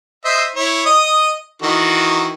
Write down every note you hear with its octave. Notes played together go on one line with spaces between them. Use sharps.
C5 D#5 E5
E4 C#5
D#5 D#6
D#3 E3 F#4